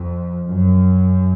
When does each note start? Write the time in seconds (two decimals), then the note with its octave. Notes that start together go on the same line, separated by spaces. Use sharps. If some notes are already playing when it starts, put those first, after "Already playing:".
Already playing: F2
0.48 F#2